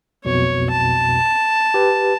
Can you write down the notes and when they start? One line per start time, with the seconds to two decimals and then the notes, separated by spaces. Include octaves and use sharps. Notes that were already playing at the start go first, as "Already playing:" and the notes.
0.25 B1 F2 B2 C#5
0.71 A5
1.74 G4 B4